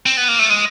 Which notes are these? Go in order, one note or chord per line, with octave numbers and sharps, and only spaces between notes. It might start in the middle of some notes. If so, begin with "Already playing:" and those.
C4
B3
A#3
A3
G#3